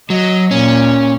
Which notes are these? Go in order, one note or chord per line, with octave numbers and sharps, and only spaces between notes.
F#3 D#5
A#2 C#4